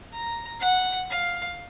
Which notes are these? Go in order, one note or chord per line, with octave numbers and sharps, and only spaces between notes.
A#5
F#5
F5